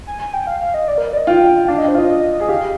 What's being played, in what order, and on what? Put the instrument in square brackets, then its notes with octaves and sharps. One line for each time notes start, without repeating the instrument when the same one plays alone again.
[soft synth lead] G#5
G#5
G5
F5
F5
D#5
D5
A#4
D5
D#5
[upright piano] F4 [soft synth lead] G5
[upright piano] D4 [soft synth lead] F5
[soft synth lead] D#5
C5
[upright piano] F4 [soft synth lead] D#5
[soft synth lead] D#5
[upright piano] G#4
[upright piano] G4 [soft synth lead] F5